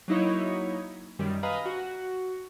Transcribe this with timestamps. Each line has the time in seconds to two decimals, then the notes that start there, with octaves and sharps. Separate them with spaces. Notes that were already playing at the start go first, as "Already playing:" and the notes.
0.08 F#3 A#3 D#4 E4 C#5
1.19 F#2 D#3 G3
1.43 B4 D#5 F5 G#5 A#5 B5
1.66 F#4 F#5